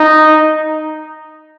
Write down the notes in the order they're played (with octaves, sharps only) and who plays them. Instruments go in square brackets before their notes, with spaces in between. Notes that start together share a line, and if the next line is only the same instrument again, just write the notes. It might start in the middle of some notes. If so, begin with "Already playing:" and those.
Already playing: [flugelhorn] D#4